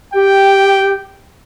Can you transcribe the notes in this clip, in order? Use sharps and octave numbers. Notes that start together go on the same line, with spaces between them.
G4 G5